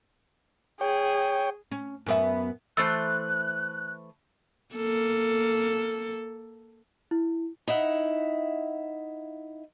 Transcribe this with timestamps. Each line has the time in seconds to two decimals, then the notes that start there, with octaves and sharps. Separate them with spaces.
0.81 G#4 C#5 G5
1.71 C#4
2.06 F#2 B3 E5
2.77 E3 A3 C5 E6 F#6 A6
4.75 A#3 A4
7.11 E4
7.67 D#4 E4 E5 F#5